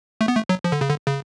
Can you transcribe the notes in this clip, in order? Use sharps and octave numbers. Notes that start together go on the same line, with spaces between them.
A3
B3
A3
F#3
F3
D3
C#3
D3
C#3